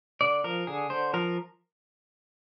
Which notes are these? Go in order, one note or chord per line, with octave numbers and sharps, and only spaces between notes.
D3 D5
F3 A#4
D3 G#4
D3 C5
F3 A#4